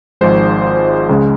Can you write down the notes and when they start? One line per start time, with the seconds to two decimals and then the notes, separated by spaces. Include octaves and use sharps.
0.21 G#1 G#2 F3 G#3 C5
1.09 C#2 C#3 G#3